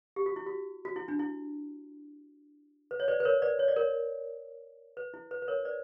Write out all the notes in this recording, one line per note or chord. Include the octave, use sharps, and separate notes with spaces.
G4
F#4
E4
F#4
F#4
E4
D4
E4
B4
C#5
B4 D5
B4
A#4 C#5
B4 D5
C#5
D5
A#4 C#5
B4
E4
B4
B4
A#4 C#5
B4 D5